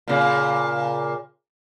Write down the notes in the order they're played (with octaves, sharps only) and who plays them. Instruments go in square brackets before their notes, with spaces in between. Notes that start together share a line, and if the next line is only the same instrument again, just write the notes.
[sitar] A#2 C#3